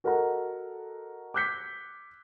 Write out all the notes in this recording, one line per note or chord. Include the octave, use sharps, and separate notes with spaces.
F#4 A4 A#4 D#5 F#5 A#5
D6 E6 F#6 G6 B6 C#7